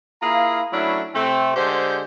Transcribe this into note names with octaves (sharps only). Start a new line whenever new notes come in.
A#3 E4 F4 G#4 F5 A#5
F#3 A3 C#4 D4 E4
C3 A3 C4
D3 G#3 G4 C5